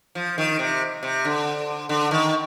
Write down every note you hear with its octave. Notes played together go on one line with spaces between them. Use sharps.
F3
D#3
C3
C3
D3
D3
D#3